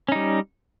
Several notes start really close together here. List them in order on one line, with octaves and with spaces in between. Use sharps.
C#4 D#4 G3